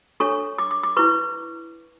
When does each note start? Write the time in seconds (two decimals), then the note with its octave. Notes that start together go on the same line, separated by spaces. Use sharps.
0.20 D4 A4 C#5 C#6
0.58 D6
0.71 D6
0.83 D6
0.97 E4 B4 C#6